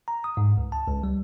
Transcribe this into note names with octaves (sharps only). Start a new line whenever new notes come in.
A#5
D#6
G#2
C#2
A5
C#2
G3